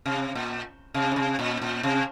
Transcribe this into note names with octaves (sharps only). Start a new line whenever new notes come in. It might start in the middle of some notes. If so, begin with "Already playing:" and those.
C3
A#2
C3
C#3
C3
A#2
A#2
C3